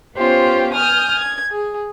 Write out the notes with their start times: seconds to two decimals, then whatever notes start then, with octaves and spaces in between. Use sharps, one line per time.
0.16 B3 C#4 F4 G4 C5
0.73 G#5 D#6 F6 G6
1.17 G#6
1.50 G#4